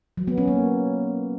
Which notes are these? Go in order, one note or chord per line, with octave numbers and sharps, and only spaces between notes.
F#3
B3
C#4
A#3